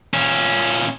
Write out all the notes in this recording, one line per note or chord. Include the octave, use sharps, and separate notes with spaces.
A#2 C#4